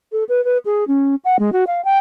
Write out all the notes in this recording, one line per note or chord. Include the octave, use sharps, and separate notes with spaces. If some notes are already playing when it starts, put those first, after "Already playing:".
A4
B4
B4
G#4
C#4
F#5
G#3
F#4
F5
G5